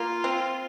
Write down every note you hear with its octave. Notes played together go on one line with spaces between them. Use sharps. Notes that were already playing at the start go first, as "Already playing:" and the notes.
Already playing: A#3 F4
C4